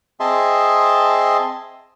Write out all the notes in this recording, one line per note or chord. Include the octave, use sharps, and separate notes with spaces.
C4 G#4 D#5 E5 A5 C6